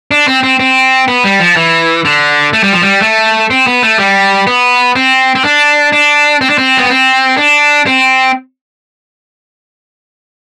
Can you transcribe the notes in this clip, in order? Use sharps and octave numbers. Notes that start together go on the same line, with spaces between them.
D4
C4
C4
C4
B3
G3
F3
E3
D3
A3
G3
F3
G3
A3
C4
B3
A3
G3
B3
C4
C4
D4
D4
C4
D4
C4
B3
C4
D4
C4